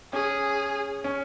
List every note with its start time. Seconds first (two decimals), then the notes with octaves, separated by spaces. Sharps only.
0.13 C#4 G#4
1.04 C#4